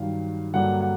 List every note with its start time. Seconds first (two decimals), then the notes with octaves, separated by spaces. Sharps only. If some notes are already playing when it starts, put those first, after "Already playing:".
Already playing: G2 D#3 F#3 F5
0.54 G2 D3 F#3 A#3 D4 F#5
0.81 F#5